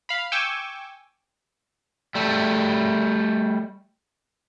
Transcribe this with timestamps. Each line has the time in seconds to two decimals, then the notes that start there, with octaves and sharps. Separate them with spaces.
0.09 F5 B5
0.32 G5 G#5 C#6 D6 E6
2.15 G3 A3